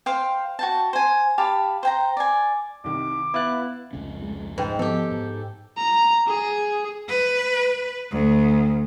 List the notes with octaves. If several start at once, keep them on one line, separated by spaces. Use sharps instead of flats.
C5 F5 G5
F#4 G5 A5
C5 G#5
G4 F5 A5 B5
C5 G5 A#5
D5 G#5
C2 D#3 D6
B3 E4 F5 F#6 A6
F1 C#2 C#4
G#3
G#2 B4 G5
F3 B3 G4 A4
G#2
A#5
G#4
B4
D2